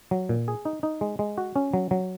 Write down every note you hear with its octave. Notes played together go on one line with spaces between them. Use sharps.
F#3
A#2
G#4
D#4
D#4
G#3
G#3
F#4
C#4
F#3
F#3